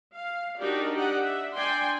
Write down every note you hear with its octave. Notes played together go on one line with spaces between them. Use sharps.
F5
D4 D#4 F#4 G4 A#4 D5
G4 D5 D#5 F#5
E5
D4 D5 G5 G#5 C6